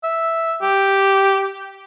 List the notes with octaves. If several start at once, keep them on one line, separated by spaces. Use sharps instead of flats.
E5
G4